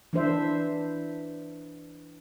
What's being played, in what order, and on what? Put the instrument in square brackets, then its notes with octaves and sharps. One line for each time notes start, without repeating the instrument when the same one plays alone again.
[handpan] E3 D4 C5 E5